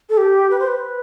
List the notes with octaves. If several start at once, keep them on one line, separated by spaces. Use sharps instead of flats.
A4
G4
B4
C5
B4